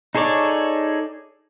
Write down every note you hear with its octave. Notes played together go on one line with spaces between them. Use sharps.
D#4 G#4 A4 C#5 D5